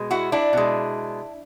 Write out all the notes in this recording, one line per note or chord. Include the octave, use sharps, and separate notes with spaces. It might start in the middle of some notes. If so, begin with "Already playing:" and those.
Already playing: B2 G#3
E4 F#4
D4 E4
B2 G#3